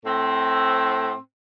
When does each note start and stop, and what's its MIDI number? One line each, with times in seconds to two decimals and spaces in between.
0.05 1.15 45
0.05 1.15 60